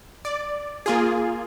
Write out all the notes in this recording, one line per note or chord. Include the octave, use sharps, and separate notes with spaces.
D5
A#3 F4 G#4